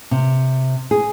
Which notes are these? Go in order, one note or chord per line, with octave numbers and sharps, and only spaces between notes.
C3
G#4